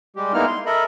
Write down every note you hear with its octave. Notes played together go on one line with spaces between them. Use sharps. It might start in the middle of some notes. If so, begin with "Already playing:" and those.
G3 G#3 G4
G#3 A#3 B3 D#4 E4 F6
C6
A4 A#4 D#5 E5 B5